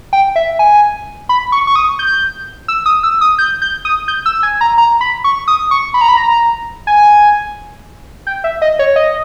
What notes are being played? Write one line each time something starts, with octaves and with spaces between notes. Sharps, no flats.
G5
E5
G#5
B5
C#6
C#6
D#6
G6
E6
D#6
E6
D#6
G6
G6
D#6
G6
E6
G#5
A#5
A#5
B5
C#6
D#6
C#6
B5
A#5
B5
A#5
G#5
G5
E5
D#5
C#5
D#5